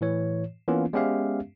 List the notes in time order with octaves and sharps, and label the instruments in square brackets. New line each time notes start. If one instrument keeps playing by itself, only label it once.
[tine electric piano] A2 E3 C#5
E3 A#3 B3 C#4 F4
G#3 B3 C#4 G4 E5 F5